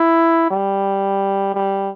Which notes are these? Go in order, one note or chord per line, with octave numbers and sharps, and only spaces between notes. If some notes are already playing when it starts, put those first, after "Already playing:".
Already playing: E4
G3
G3